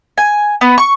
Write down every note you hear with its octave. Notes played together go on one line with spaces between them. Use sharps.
G#5
B3
C#6